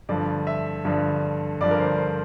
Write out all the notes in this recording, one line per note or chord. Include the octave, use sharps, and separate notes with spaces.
G2 D3 F3 D5
E5
G2 D3 F3
G2 D3 F3 D5
A#4
C5
C5